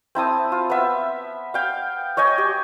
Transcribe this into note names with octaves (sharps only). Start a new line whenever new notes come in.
C4 E4 A5 D#6
F4
B3 E5
F5 G5
C#5 D#5 G5 G#5
G4